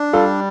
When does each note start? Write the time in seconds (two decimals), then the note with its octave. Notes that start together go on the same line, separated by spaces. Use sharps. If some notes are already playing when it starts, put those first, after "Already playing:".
Already playing: D4
0.13 G3 F4 A4